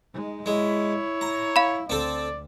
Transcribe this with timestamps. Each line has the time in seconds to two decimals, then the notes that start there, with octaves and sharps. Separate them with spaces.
0.14 G#3 D#4
0.46 G#3 E4 C#5
1.21 A#5
1.56 F5 B5
1.90 D2 C4 A4 D5